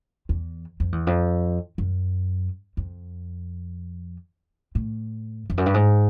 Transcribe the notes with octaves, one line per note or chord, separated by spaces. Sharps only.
E2
F2
E2
F2
F#2
F2
A2
F2
F#2
G2
G#2